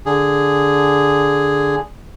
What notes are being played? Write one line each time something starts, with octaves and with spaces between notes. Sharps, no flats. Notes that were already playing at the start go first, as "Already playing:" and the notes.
D3 G#4